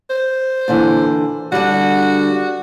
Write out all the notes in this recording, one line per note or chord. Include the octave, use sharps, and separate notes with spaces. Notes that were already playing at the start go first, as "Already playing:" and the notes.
C5
A#2 D3 E3
D3 G3 F#4